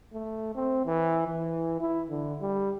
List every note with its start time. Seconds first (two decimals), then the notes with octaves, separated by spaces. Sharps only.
0.14 A3
0.55 C4
0.86 E3
1.27 E3
1.81 E4
2.10 D3
2.41 G3